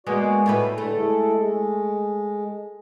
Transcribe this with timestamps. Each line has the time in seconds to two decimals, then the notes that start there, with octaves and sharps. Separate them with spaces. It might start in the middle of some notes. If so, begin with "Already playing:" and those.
0.07 G#3 A#3 B3 F#4 D5
0.46 A2 G3 B4 E5
0.78 A2 D3 A3
0.94 G#3 E4 A4
1.38 G#3